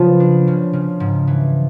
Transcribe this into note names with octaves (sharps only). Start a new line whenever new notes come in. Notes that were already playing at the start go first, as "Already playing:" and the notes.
Already playing: C#3 F3 F#3 B3
D4
C#3
C#3
G#2
E3